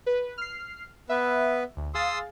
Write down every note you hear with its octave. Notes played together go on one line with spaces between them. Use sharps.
B4
F6 C7
B3 B4 E5
D2
G#4 F5 C6 D#6 E6 A6